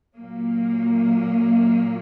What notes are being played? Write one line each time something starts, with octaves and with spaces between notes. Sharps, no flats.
A#2 F#3 A#3